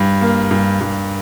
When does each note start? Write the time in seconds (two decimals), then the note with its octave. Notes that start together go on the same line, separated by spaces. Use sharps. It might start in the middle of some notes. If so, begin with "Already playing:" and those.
Already playing: G2
0.21 A#3
0.51 G2
0.81 G2